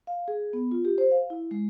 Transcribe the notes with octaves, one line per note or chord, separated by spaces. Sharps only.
F5
G#4
B3
F4
G4
C5
F5
E4
G#3